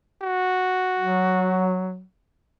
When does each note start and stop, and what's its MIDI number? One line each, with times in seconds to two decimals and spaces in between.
0.22 1.86 66
0.99 2.03 54